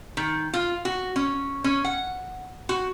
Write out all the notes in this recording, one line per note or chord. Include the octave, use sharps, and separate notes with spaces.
D#3
F4
F#4
C#4
C#4
F#5
F#4